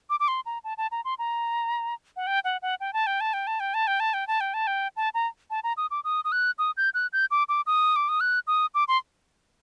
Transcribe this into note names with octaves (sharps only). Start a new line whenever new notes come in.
D6
D6
C6
A#5
A5
A5
A#5
C6
A#5
F#5
G5
F#5
F#5
G5
A5
G5
A5
G5
A5
G5
A5
G5
A5
G5
A5
G5
A5
G5
A5
A#5
A5
A#5
D#6
D6
D#6
D#6
F#6
D#6
G6
F#6
G6
D6
D6
D#6
D6
D#6
F#6
D#6
D6
C6